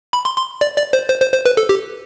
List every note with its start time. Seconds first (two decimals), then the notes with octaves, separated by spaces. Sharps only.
0.13 B5
0.25 C6
0.37 C6
0.61 D5
0.78 D5
0.93 C5
1.09 C5
1.21 C5
1.33 C5
1.46 B4
1.57 A4
1.69 G4